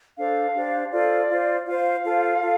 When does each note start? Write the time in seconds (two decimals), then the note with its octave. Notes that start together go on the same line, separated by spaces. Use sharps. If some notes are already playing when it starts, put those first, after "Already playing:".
0.17 D4 A4 C5 F5
0.54 D4 G4 C5
0.92 F4 A4 C5 D5
1.29 F4 C5
1.66 F4 C5 F5
2.03 F4 A4 C5
2.41 F4 A4